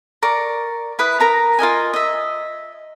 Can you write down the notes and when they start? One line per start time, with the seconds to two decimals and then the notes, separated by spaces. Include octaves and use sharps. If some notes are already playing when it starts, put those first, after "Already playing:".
0.23 A#4 D5 C#6
0.99 E4 B4 D#6
1.20 A#4 A#5 B5
1.59 F4 A#4 D#5 G#5
1.93 D#5 E5